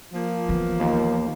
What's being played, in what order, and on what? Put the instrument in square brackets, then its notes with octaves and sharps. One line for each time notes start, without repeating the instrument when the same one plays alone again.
[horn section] F3 A#3
[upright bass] E3 B3
[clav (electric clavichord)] D#2